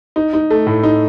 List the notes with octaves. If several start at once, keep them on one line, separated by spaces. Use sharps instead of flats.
D#4
D#4
A3
A2
D#4